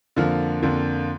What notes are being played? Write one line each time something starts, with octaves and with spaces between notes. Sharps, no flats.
F2 D3 F3 A#3
F2 D3 F3 A#3